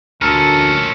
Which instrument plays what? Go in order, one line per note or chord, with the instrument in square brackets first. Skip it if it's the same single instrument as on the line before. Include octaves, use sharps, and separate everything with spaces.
[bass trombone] D2 [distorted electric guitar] A#2 C#4 [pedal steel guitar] A4 A#4